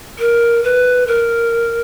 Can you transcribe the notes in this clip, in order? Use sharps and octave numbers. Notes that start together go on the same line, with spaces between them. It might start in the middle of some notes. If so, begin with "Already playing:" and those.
A#4
B4
A#4